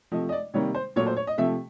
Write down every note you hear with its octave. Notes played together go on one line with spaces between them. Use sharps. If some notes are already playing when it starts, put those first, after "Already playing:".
C3 F3 A3 D#5
D#5
D5
C3 D#3 G3 A#3 C#5
C5
A#2 F#3 A3 C#5
C5
C#5
D#5
C3 F3 A3 E5